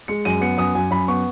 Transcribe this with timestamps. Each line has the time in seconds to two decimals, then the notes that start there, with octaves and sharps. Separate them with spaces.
0.08 G#3 C#7
0.25 F#2 D#7
0.41 B3 C#7
0.58 F#2 D#6
0.75 F#2 G#5
0.91 F#2 B5
1.08 B3 C#6